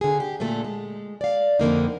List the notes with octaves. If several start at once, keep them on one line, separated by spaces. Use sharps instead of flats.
D3 G#4
G4
A#2 D3 A3 A4
G#3
D5 F5
F2 D3 A#3 D#4